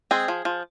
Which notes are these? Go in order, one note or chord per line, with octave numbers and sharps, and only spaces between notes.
G#3 C4 G#4
F3
F3